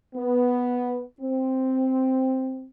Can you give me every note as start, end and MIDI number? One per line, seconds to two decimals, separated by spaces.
0.15 1.01 59
1.20 2.66 60